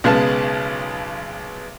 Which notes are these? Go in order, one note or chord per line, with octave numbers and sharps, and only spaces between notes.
B1 C#3 G#3 B3 F5 A5